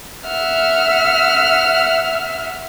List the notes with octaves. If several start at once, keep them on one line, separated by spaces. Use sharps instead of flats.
E5 F#5 F6